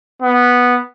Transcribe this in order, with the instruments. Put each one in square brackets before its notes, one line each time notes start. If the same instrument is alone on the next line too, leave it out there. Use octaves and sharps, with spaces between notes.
[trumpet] B3